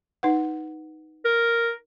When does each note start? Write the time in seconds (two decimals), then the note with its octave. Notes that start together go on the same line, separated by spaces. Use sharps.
0.23 D#4 B4 F#5
1.25 A#4